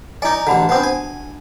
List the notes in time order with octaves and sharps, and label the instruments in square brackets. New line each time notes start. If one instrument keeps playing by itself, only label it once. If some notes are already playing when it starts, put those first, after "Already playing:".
[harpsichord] D#4 D5 [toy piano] E4 D#5 G#5
[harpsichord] A1 D3 [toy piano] F#4 A5 B5
[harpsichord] B3 C4 [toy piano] D4 F#5 D#6
[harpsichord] G#5